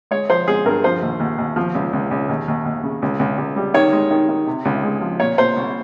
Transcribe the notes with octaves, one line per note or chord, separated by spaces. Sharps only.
G#3 C#5
F3 C5
G#3 G#4
G2 A#4
F3 C5
D#2
D#2
D#2
F3
C#2
C#2
C#2
D#2
D#2
D#2
C#3
C#2
C#2
C#2
G3
D#3 C#5
G#3
D#3
D#3
C3
C#2
G#3
F3
A#2 C#5
A#2 C5
C2